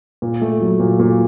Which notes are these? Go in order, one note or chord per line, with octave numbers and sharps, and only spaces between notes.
A#2
A3
F#3
A#2
A#2